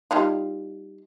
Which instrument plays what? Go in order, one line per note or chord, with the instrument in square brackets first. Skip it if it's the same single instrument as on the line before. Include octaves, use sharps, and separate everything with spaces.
[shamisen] G3 D#4 F4